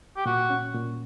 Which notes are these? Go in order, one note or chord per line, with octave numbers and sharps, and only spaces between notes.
G4
A#2 F#4
C#4
A#2